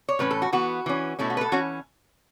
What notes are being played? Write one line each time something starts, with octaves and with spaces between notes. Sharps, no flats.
C#5
A2 E3 C#4 B4
A4
F#4
E3 B3 F#4
E3 C#4
B2 A3 C#4 E4
F#4
B4
A4
E3 C#4 F#4